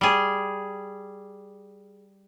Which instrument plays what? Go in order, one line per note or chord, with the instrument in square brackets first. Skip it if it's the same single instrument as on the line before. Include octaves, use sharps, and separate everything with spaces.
[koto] G3 G#4